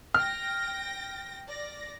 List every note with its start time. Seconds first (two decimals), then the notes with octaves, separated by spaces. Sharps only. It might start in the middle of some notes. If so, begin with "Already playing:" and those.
0.14 G5 F6 A#6
1.48 D5 A#6